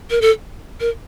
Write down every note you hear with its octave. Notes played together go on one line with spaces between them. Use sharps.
A#4
A4
A#4